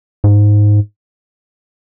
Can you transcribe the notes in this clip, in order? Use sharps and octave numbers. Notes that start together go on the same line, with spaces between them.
G#2